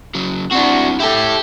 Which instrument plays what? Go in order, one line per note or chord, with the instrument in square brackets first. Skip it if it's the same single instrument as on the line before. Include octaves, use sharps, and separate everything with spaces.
[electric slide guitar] C#3 F#3
[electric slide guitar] C4 E4 [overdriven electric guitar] D4 F#4
[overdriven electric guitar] E4 A4 [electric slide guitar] G4 G5